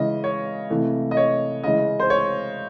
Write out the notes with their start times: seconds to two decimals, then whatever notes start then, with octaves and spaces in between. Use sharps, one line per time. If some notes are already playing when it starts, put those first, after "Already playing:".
Already playing: C#3 E3 G#3 D#5
0.24 C#5
0.70 C3 E3 A3
1.11 D#5
1.17 C#5
1.64 C#3 E3 G#3 D#5
2.00 C5
2.10 C#5